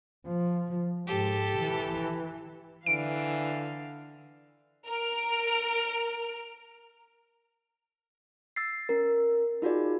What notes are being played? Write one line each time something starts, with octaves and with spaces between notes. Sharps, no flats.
F3
G#2 G4 A4
E3
D3 E3 F5 D7
A#4 F6 D7
E6 A6 C7
C#4 A#4
D#4 F4 F#4 G#4 D5